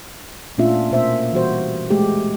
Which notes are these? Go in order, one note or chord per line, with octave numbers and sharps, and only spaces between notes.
A#2 A3 C#4 D4 F4 E5
B2 A#3 C5 E5
E3 G3 F#4 C5
G#3 A3 G4